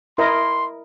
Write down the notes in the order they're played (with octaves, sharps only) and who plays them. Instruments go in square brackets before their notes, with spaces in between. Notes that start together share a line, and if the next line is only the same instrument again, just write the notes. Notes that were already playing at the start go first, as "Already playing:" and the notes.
[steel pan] E4 A#4 D#5 [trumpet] C6